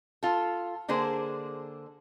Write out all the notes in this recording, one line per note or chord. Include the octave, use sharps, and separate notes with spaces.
F4 A4
D3 A#3 D4 G#4 C5